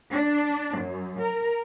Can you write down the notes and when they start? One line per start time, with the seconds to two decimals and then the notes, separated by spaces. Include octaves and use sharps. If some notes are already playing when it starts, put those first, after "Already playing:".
0.12 D4
0.78 F#2
1.21 A#4